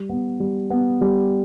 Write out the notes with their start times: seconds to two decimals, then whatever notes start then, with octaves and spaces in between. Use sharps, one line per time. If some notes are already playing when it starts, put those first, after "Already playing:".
Already playing: G3
0.09 B3
0.40 G3
0.70 B3
1.01 G3